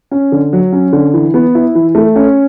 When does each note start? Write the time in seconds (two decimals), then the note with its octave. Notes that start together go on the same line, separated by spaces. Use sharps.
0.11 C#4
0.32 D3
0.53 F#3
0.72 C#4
0.93 D3
1.14 E3
1.34 B3
1.55 E4
1.75 E3
1.95 A3
2.16 C#4